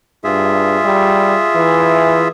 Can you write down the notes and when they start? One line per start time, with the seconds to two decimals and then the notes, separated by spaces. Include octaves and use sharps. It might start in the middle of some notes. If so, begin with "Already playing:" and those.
0.24 G2 F4 G#4 E5
0.85 G3
1.55 E3